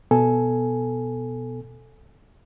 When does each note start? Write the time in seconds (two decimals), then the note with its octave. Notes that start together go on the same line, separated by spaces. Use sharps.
0.11 B2 B3 A4 G#5